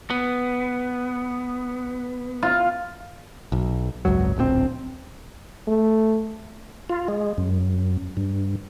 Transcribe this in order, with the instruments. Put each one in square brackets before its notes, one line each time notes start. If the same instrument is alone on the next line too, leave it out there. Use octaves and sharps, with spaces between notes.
[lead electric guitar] B3
[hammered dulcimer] F4
[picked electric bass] B1
G#1 C#2 F#2 F#3
D1 A#1 A2 C4
[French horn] A3
[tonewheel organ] F4
G#3
F#2
G2